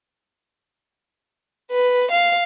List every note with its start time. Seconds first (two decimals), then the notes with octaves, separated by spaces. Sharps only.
1.71 B4
2.11 F5